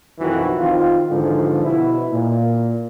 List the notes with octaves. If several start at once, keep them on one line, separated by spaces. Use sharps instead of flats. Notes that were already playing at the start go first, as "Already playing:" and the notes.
B1 F2 D#3 E3 F#4
D#3 C4 F4
G#2 D3 E3 F3
B2 E4
A#2